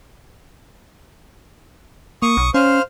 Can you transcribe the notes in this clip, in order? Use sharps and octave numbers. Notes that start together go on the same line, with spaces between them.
A#3 C#6 D#6
B1
C#4 C5 F5 F6